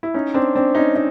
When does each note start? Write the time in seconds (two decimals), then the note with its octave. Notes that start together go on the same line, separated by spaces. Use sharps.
0.03 E4
0.14 C#4 D#4
0.34 C4 D4
0.55 C4 D4
0.75 C#4 D#4
0.96 D#4